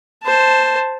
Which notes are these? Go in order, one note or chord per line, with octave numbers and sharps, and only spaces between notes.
C5 A5